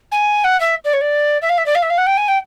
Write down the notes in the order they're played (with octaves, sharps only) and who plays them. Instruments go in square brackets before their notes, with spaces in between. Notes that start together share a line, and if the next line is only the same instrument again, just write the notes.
[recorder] G#5
F#5
E5
D5
C#5
D5
E5
F5
E5
D5
F5
E5
F5
F#5
G5
G#5
G5